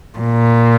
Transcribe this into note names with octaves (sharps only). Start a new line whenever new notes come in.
A#2